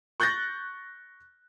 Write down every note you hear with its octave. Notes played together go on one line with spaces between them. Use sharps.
C#6 F#6 G6 A6 A#6